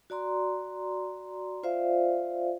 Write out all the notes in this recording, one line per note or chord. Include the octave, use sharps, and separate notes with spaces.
F#4 D5 A#5 C6
F4 C5 D5 E5 F5